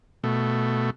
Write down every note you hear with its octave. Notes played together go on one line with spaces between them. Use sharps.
B2 A3